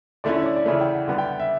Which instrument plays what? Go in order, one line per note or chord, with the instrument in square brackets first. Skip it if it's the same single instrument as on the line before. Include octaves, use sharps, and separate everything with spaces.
[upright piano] D3 A3 C#4 E4 [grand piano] D5
[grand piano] E5
C#5
D5
D5
[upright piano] C#3 E3 A3 [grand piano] E5
[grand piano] G5
F#5
[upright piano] D3 G3 B3 [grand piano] F#5
[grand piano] G5
F#5
E5